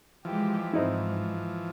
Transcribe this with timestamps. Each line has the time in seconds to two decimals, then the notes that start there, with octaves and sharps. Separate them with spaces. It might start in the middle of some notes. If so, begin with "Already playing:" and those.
0.25 E3 F3 G#3 G4
0.73 G#2 C4 D#4 E4